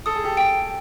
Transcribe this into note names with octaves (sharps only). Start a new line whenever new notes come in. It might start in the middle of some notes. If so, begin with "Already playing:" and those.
A4 D#6
G#4
G4 A4
G5